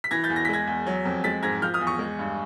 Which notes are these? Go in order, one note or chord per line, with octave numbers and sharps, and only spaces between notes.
B6
E3 G#6 A#6
G6 A6
E2
A#6
B6
G#3 G#6 A#6
E2
F#3
F2
G#3 A6 B6
G#2 G#6 A#6
F3 F6 G6
D#6 F6
E2
C#6 D#6
G#3
G2